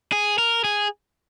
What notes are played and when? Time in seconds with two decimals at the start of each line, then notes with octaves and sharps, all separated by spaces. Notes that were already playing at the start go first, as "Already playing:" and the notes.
0.12 G#4
0.38 A#4
0.64 G#4